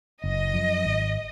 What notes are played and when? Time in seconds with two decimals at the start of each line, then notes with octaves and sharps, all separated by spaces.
0.23 F#1 D#5
0.54 F#2 F3
0.85 G#1